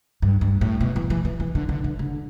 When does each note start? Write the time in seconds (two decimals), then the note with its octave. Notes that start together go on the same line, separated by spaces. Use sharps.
0.22 G2
0.41 G2
0.61 A2
0.81 B2
0.96 E3
1.10 E3
1.25 E3
1.40 E3
1.55 D3
1.69 D3
1.84 D3
1.99 D3